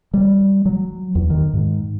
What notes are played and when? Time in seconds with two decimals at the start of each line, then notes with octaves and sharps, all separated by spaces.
0.14 G3
0.65 F#3
1.15 E2
1.30 D#3
1.53 G#2